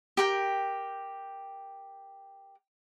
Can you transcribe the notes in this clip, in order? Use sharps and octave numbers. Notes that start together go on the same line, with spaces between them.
G4 A#4 G5